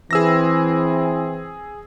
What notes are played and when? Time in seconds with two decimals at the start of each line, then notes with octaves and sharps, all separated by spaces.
0.11 E3 C4 G#4 E6 A#6